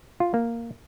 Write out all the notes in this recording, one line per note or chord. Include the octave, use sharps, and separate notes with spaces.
F4
A#3